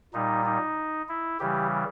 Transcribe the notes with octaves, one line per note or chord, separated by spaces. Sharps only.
A#2 G3 D#4
D#4
E4
C#3 E3 G3 G4